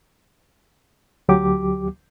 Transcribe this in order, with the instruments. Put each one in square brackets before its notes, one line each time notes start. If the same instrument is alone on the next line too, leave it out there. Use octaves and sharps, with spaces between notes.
[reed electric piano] D2 F#3 G4 D6